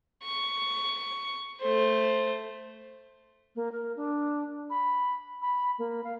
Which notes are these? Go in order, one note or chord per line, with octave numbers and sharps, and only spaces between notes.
C#6
A3 C5
A#3
A#4
D4
B5
B5
A#3
F5